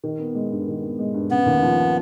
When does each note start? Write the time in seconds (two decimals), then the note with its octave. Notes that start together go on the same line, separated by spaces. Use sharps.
0.03 D#3
0.19 B3
0.35 G#3
0.52 G2
0.68 D#3
0.83 B3
0.99 G#3
1.14 G2
1.31 C#3 B3
1.46 D#2
1.63 F3